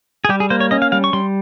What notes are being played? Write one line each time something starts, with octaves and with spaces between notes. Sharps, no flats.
G#4
G3 G4
G#4
A#3 C5
C#5
C#4 D#5
F5
G3 F5
C#6
G3 C6